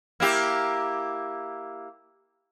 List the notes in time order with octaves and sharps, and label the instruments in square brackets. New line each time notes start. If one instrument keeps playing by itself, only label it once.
[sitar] A#3 E4 G4